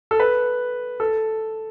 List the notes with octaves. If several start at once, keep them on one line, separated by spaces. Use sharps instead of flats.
A4
B4
A4